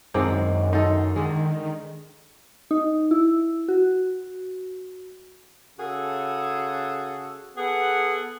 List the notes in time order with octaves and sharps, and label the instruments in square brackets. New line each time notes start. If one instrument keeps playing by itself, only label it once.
[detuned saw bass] F#2 [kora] D#3 G#3 D4 [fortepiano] C4
[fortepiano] D#4 [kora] A4 C5
[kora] D3 G#3 [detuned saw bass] D#3
[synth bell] D#4
E4
F#4
[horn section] C#3 F#4 G#4 A4
B3 G#4 A4 F#5